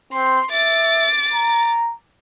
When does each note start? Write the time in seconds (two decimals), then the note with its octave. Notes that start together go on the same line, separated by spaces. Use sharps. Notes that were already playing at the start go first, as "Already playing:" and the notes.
0.13 C4 C6
0.51 E5 D6 A6
1.33 A#5